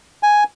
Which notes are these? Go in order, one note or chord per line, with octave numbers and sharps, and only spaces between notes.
G#5